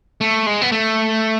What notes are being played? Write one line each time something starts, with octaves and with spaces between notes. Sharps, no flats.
A3
G#3
B3
A3